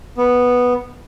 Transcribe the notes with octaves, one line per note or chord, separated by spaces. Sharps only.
B3